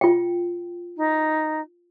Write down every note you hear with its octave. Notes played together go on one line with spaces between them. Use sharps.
F4 G5
D#4